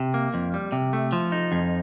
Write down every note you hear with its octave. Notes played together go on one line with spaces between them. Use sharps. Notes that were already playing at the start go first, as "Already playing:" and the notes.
Already playing: C3
A#3
F2
G3
C3
A3
F3
D#4
F2